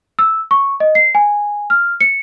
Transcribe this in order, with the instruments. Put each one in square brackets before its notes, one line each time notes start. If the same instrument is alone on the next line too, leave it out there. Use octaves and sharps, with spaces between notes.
[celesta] E6
C#6
D#5
C7
G#5
F6
C#7